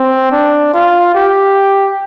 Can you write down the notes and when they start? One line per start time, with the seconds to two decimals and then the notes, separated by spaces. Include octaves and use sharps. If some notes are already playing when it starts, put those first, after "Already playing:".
Already playing: C4
0.31 D4
0.74 F4
1.15 G4